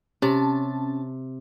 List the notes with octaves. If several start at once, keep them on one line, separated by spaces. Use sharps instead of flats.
C3 C#4 A5